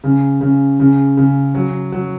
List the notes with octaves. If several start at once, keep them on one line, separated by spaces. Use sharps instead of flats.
C#3
C#3
C#3
C#3
F#3
F#3